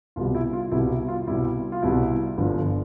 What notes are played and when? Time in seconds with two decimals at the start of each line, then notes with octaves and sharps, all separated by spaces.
0.16 C2 B2 G3 F4
0.35 E4
0.53 F4
0.72 C2 B2 G3 E4
0.90 E4
1.08 F4
1.27 C2 B2 G3 E4
1.72 F4
1.82 C2 B2 G3 E4
2.38 G1 G2 F3